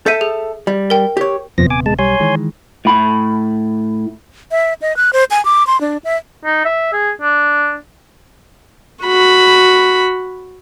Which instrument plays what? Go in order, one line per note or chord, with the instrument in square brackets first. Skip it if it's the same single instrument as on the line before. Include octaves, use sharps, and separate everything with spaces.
[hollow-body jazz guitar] A4 E5 [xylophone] G6 B6 D#7
[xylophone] G#4
[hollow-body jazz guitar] G3
[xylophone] A#4 G5
[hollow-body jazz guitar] G4 C#5
[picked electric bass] D#1 C3 B3 [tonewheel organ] F2 F3 A#6
[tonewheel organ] G#5 D6
G#3 A5
[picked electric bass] B1 G3 [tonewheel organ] C#5 G#5 C6
[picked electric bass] D#3 E3 G#3
[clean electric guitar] A2 B5
[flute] E5
D#5
F#6
C5
G#5
D6
C6
D4
E5
[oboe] D#4
E5
G#4
D4
[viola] F#4 B5